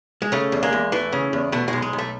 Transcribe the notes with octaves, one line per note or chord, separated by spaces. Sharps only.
G#3
C#3 A3
E2
G#3 A#3
E2
E3 A3
C#3
E2
B2 A3
B1 G#3
G#3
B1
A3